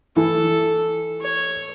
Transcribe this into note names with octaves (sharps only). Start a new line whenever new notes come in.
E3 A4
C#5